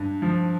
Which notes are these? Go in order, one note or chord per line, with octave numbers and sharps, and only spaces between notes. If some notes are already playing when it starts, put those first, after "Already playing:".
Already playing: G2
F3